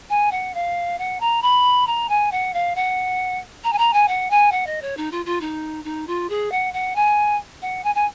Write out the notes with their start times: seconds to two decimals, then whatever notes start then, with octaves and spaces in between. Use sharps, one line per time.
0.10 G#5
0.31 F#5
0.54 F5
0.98 F#5
1.20 A#5
1.42 B5
1.87 A#5
2.09 G#5
2.32 F#5
2.54 F5
2.76 F#5
3.64 A#5
3.73 G#5
3.78 A#5
3.93 G#5
4.08 F#5
4.30 G#5
4.52 F#5
4.67 D#5
4.82 C#5
4.97 D#4
5.11 F4
5.26 F4
5.41 D#4
5.84 D#4
6.07 F4
6.29 G#4
6.52 F#5
6.73 F#5
6.95 G#5
7.62 F#5
7.84 G#5
7.95 G#5